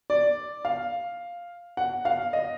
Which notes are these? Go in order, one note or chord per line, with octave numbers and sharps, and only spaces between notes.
D5
F5
F#5
F5
D#5